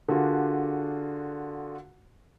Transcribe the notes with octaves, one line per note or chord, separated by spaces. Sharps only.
D3 D4 F4 F#4 G#4 A#4